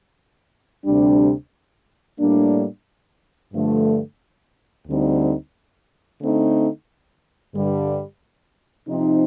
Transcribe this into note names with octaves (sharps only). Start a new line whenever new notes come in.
D2 C3 G3 D4
A2 G3 A#3 D4
G2 D3 F3 A3
D2 D3 G3 C4 D#4
D3 A3 C4 D#4
G2 D3 G3
C3 F3 C4 D#4